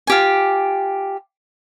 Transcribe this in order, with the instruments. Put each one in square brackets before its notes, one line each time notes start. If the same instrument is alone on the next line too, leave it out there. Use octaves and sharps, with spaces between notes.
[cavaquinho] F4 G4 G#5